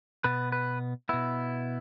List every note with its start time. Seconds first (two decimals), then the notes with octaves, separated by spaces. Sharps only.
0.24 B2 B3 B4
0.52 B4
1.09 B2 B3 E4